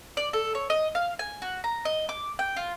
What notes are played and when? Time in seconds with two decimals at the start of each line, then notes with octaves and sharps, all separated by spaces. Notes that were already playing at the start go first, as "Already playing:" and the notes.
0.17 D5
0.33 A4
0.55 C#5
0.70 D#5
0.95 F5
1.19 G#5
1.42 F#4
1.64 A#5
1.85 D#5
2.09 D6
2.39 G5
2.57 F4